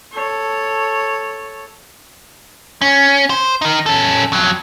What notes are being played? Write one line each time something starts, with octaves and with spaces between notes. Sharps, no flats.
A4 C#5
C#4
C5
D#4 A#4
C#4 A4
F2 F#3